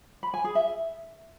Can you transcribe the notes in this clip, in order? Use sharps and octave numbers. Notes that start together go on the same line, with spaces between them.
B5
G#5
G#4
E5